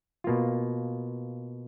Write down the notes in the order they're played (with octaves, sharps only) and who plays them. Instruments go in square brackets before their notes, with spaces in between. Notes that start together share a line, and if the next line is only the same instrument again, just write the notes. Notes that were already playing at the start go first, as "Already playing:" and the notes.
[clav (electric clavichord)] B2 A#3 F4